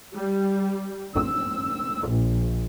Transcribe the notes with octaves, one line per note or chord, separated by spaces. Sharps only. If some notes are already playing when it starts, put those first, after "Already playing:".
G3
E6
A#1